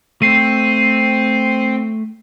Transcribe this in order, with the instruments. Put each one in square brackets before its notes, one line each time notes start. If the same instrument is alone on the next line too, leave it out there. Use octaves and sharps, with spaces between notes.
[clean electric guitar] A3 [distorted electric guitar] C4 [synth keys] C7 D#7